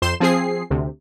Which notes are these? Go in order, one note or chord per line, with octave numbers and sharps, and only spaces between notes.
F2 C5 C6 E7
F3 C4 G#4 C7
D2 C3